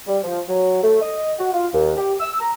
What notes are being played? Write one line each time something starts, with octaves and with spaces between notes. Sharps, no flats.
G3
F3
F#3
A3
D#5
F#4
F4
D#2
G4
E6
A#5